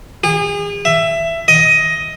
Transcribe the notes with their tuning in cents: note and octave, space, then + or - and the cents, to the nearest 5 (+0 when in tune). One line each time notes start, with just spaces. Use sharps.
G#4 -35
E5 +15
D#5 +10